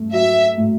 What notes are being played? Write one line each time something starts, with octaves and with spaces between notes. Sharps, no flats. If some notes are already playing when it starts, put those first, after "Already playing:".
Already playing: A3
F#3 E5
A2